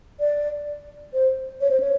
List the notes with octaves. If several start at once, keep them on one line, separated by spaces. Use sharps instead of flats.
D5
C5
C#5
C5
C#5